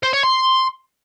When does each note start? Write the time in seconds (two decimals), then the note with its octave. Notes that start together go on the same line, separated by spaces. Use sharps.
0.03 C5
0.13 C#5
0.24 C6